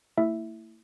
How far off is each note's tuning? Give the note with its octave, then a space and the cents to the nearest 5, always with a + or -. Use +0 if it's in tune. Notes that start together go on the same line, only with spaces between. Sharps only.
A3 +45 E4 +0 E5 +0